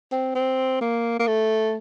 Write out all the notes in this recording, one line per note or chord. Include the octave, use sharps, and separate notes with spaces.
C4
C4
A#3
A#3
A3